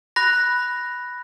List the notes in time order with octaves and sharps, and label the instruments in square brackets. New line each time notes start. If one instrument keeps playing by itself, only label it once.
[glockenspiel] B5 F#6 A#6